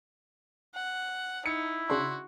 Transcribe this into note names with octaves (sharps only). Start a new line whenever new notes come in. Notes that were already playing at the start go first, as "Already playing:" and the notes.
F#5
D#4 E4 C#7
C#3 D4 F#4 C6